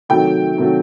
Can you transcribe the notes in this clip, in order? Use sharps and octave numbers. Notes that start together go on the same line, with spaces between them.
C3 D#3 F#3 A3 G5
C3 D#3 F#3 A3